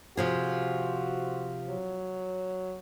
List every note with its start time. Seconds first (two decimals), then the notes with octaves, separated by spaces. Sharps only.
0.17 C3 F3 F#4 G#4
1.69 F#3